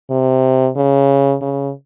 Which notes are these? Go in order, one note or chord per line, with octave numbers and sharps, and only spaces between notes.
C3
C#3
C#3